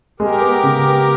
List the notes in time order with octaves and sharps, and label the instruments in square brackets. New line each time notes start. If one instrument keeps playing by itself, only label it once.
[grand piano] G#3 [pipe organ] G4 A#4
[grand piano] B3
C#3
B3